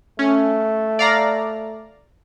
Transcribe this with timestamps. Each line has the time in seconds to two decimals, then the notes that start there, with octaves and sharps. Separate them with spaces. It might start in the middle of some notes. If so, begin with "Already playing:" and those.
0.19 A3 C#4
0.99 D5 F5 A#5